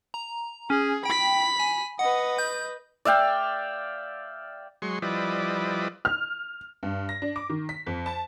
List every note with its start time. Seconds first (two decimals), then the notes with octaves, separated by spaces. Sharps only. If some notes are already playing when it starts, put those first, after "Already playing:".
0.14 A#5
0.70 C#4 G#4
1.05 G5 B5 B6
1.59 G#5
1.99 B4 D#5 F#5
2.39 G6
3.05 D5 E5 F5 G5
4.82 F#3 G#3 C6 C#6
5.02 F3 G3 E4 B4 D5 D#5
6.05 F6
6.83 G2
7.09 A#6
7.22 D4
7.36 D6
7.50 D#3
7.69 B6
7.87 F2
8.06 A5